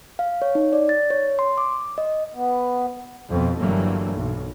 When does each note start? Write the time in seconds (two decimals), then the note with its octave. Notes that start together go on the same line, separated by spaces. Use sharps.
0.19 F5
0.42 C#5
0.55 D#4
0.73 D5
0.89 A6
1.10 C#5
1.39 C6
1.58 D6
1.98 D#5
2.35 B3
3.29 F2 B2
3.59 G1 G2 E3 F#3 A3 A#3
4.11 B1